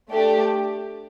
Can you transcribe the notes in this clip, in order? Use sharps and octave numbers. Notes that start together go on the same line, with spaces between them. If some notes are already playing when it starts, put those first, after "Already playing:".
A3 D4 G4